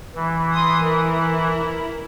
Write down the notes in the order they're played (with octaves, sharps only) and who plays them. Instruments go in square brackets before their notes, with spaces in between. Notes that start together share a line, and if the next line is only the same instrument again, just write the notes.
[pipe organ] E3
[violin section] C6 D#6
E4 A#4